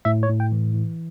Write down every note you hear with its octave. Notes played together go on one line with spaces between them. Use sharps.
A2 E5
C#5
A2
G5
E3
E3